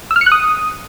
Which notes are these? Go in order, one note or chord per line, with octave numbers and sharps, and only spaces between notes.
E6
F6
C#7
F#6
D#6